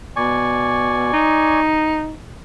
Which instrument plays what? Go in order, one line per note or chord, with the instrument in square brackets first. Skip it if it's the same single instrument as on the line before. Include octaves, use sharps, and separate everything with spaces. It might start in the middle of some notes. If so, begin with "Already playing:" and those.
[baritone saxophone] B2 [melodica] D5 G#5 C#6
[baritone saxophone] D#4